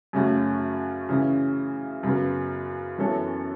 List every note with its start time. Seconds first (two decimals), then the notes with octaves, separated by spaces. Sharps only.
0.13 F#2 C#3 A3 C#4 F#4
1.09 C#3 E3 C#4
2.03 F#2 C#3 F#3 B3
2.98 F#2 E3 B3 A4 C#5